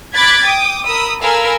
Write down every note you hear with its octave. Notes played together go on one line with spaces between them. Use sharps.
B5 D6 F#6 G#6 A6 B6
G5 D6 D#6
A#4 B5 D#6 E6
A4 A#4 F5 G#5 B5 E6